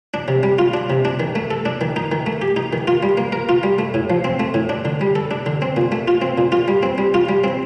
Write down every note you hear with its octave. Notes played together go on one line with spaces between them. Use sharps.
D4
C3
G3
F4
D4
C3
D4
D#3
A3
A4
D4
D#3
D#4
D#3
A3
G4
D#4
D#3
F4
G3
A#3
A#4
F4
G3
A3
A2
F3
C4
A3
A2
D4
D3
G3
A4
D4
D3
C4
A#2
A3
F4
C4
A#2
F4
G3
C4
G3
F4
G3
C4